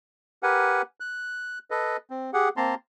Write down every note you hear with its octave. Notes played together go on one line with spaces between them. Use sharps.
G4 A#4 B4 F#5 G#5
F#6
A4 B4 D#5
C4
G4 G#4 F#5
A#3 C4 A5 A#5 C6